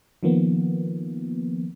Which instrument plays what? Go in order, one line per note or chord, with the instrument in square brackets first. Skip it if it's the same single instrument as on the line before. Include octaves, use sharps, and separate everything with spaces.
[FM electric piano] D#3 F3 A#3 B3